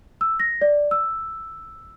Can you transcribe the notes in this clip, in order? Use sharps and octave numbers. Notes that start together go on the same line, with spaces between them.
E6
A#6
D5
E6